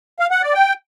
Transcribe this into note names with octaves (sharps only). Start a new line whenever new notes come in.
F5
F#5
D5
G5